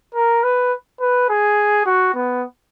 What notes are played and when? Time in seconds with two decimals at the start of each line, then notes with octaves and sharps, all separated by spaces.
0.15 A#4
0.43 B4
1.01 B4
1.29 G#4
1.86 F#4
2.15 B3